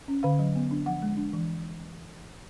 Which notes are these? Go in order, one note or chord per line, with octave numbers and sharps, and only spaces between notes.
C#4
D3 F5
F#3
B3
D4
F3 F#5
G#3
D4
E3